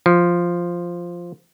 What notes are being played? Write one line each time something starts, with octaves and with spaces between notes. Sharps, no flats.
F3